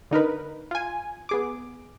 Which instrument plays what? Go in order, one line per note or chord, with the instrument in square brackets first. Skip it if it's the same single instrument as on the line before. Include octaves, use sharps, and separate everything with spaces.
[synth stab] D3 D#4 A#4 B4
F4 G#5
B3 G#4 D6